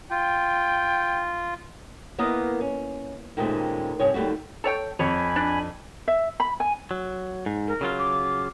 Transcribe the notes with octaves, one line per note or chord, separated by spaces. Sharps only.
F4 G5
A#3 B3 E4 A#4 D#5
C#4
D#2 A#2 C#3 G#3 A3 C4
G2 C3 G#4 C#5
D#2 G3 A3 F#4
A4 C#5 G5
F2 C#5 G#5 B5
D4
E5
B5
G#5
F#3
G#2
A#4
C#3 F#3 F4
D6